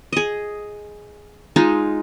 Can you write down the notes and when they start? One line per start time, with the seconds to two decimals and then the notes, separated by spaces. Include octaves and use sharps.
0.13 G#4 D#5
1.56 G#3 D#4 F4